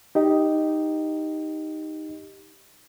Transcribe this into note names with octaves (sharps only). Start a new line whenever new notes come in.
D#4 G4 D#5